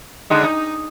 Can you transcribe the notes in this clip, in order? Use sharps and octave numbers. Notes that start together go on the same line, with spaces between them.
D3 G#3 D#4
D#4